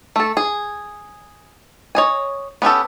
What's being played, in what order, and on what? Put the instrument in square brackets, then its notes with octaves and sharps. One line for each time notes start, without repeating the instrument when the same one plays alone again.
[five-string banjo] A3 A4
G#4
C#5 D#5 G#5
B3 C#4 G4 A4